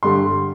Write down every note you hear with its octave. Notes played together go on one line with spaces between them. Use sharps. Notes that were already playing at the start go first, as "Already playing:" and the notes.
G2 D3 G3 C6